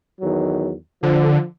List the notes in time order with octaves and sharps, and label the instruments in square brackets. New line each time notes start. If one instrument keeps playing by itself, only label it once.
[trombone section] E2 D#3 F#3
[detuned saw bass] D3 [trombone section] F3